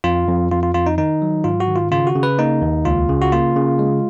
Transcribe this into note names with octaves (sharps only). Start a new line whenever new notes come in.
F2 F4
F2
F2 F4
F4
F2 F4
D#4
D#3 D#4
F#3
G#2 F4
F#4
D#3
F4
C#3 F4
F#4
C#3
B4
A#3 D#4
D#2
C#2 F4
C#3
F#4
A#3 F4
C#3
G#3